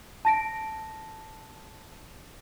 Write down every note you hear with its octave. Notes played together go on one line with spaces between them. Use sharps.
A5 A#6 D7